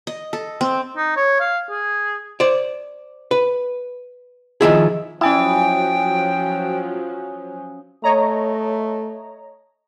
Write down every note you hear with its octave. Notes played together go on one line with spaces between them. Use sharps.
D#5
A4
C4
D#4
C#5
F5
G#4
C5 D5
B4
D#3 F3 E4 G#4
F3 F#3 C#4 E4 G5 G#5 D#6
A3 C#5 D#5 A#5